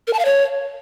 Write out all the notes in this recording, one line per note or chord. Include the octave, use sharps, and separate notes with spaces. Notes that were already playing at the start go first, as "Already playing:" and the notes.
A#4
A5
F5
C#5